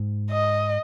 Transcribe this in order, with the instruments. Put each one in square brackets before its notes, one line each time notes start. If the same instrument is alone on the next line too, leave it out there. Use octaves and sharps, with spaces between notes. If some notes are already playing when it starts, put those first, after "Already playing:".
Already playing: [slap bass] G#2
[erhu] D#5